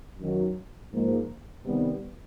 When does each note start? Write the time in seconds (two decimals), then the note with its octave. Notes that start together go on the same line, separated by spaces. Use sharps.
0.18 F#2 D#3 F#3
0.92 G#2 F3 A#3
1.65 C3 D#3 G3 B3